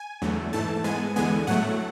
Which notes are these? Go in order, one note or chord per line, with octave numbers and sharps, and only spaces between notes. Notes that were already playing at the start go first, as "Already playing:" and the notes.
Already playing: G#5
E2 D3 F#3 A3
G#2 E3 A3 A5
G#2 G#3 B3 G#5
E2 D3 G#3 B3 G#5
A2 F#3 A3 F#5